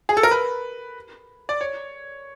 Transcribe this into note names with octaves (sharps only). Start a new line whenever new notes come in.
G#4
A4
A#4
B4
D5
C#5